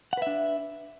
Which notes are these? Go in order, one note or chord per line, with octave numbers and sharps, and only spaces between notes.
D4 B4 E5 F#5